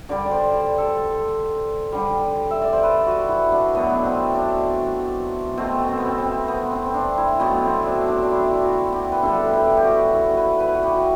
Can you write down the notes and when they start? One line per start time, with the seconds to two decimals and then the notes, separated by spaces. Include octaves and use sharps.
0.09 D3 G3 D5
0.26 D5
0.31 C5
0.78 A4
1.92 D3 G3
2.51 E5
2.62 D5
2.73 C5
2.83 B4
3.06 F#4
3.28 E4
3.52 D4
3.75 B2 F#3 A3 B3
3.95 D4
4.05 C4
4.35 D4
5.57 B2 A3 C4
5.88 C4
5.97 B3
6.05 C4
6.18 C4
6.48 B3
6.71 C4
6.85 C4
6.94 D4
7.18 E4
7.40 B2 F#3 A3 B3
7.63 C4
7.86 D4
8.08 D4
8.23 D4
8.31 E4
8.51 E4
8.62 F#4
8.92 G4
9.12 B4
9.23 D3 G3 A4
9.53 G4
9.77 G4
9.84 F#4
10.14 E4
10.37 B4
10.60 B4
10.75 F#4
10.83 G4
10.95 F#4